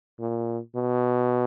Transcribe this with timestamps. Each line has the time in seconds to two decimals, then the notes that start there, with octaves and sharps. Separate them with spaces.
0.20 A#2
0.75 B2